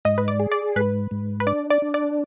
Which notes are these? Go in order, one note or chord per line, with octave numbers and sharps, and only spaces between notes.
G#2 D#5
B4
D5
G#4
D5
G#2 B4
G#2
B4
D4 D5
D5
D4
D5